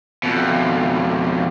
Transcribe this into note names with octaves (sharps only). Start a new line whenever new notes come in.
F2 B2